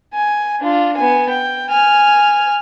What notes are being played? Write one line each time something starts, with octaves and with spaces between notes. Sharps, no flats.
G#5
D4 F4
B3 G#5
G5
G#5 F6